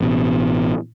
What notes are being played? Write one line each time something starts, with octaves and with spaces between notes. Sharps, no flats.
A1 B2